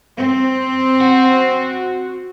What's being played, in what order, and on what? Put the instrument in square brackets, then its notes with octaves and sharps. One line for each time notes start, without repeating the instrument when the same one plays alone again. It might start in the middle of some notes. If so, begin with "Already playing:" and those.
[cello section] C4
[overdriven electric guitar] F#4